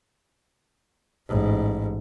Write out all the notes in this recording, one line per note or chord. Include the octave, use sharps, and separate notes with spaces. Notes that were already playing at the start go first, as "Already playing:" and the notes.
A1 G#2